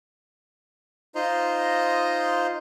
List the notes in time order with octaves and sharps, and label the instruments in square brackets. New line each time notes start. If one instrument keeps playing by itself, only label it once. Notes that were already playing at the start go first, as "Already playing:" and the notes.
[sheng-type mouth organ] D#4 F4 C5 D#5 A#5 C6